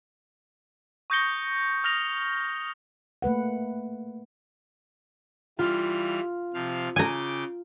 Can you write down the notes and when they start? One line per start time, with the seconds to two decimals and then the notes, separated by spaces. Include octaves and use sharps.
1.10 C#6 D#6 G6 A#6 C#7 G7
1.84 D#6 F6 A#6 F7
3.22 A3 A#3 B4 F#5
5.59 E3 G3 F4 F6
6.54 C3 F3 F5
6.96 C#3 G5 G#5 A#5 D6